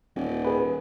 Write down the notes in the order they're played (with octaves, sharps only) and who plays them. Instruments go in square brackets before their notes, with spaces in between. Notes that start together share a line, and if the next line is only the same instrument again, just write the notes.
[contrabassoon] D#1
[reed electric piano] G#4 B4